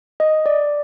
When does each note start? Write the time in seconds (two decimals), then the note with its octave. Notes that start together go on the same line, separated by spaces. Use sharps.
0.20 D#5
0.46 D5